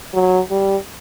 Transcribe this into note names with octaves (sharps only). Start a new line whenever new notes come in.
F#3
G3